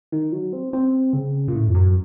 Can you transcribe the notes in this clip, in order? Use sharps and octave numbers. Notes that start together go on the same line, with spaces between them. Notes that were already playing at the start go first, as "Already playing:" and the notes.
D#3
F#3
C4
C4
C#3
A#2
A2
F2
F#2